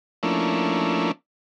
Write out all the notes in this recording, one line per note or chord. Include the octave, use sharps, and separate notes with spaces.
F3 A3 A#3 C#4 D4 E4